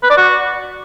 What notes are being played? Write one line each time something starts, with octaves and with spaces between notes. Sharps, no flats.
B4
D5
F#4